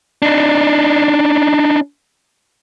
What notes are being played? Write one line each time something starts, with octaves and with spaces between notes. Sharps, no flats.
D4 D#4